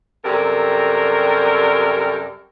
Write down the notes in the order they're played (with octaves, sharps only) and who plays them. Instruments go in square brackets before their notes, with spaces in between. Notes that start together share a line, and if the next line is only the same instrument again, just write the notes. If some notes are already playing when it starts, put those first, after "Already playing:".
[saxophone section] F#2 C3 G3 A4 A#4